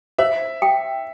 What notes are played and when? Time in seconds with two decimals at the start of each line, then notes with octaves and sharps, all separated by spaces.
0.18 C5 E5
0.62 G5